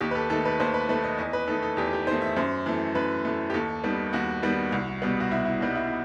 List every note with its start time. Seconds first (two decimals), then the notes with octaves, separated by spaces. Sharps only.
0.01 D#2 G4
0.11 B4
0.15 A4
0.30 D#3 A3 A4
0.45 B4
0.60 D#2 C5
0.74 B4
0.88 D#3 A3 B4
1.04 D#5
1.18 E2 D#5
1.33 B4
1.48 D#3 A3 A4
1.62 A4
1.77 E2 G4
1.93 G4
2.07 D#3 A3 C5
2.22 E5
2.36 F#2 C5
2.66 E3 A3
2.95 F#2 B4
3.25 E3 A3
3.50 G4
3.54 D#2 A4
3.84 D#3 G3 B3
4.13 D#2 F#4
4.43 D#3 G3 B3
4.72 C2
5.02 B2 G3 B3
5.20 F#4
5.31 C2 E4
5.45 E4
5.60 B2 G3 B3 D#4
5.75 E4